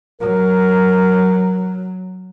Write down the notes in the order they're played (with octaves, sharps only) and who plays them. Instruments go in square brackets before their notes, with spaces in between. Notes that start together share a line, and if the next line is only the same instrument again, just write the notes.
[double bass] F#3 [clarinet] A#4